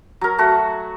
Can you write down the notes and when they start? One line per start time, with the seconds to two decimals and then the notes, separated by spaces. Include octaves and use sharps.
0.21 F#3 A#4
0.38 A3 F#4